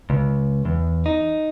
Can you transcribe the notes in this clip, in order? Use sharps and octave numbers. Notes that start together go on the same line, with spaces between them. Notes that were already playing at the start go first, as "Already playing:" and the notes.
C#2
E2
D#4